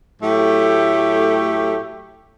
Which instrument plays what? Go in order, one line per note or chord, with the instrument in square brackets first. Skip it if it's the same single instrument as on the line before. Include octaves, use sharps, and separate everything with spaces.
[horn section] A2 F#3 A3 G4